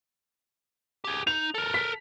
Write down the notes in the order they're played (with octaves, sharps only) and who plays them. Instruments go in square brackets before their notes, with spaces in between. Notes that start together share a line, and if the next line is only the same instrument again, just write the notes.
[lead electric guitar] G4 G#4
[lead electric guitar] D#4 [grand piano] F7
[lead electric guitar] A4 A#4
[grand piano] B6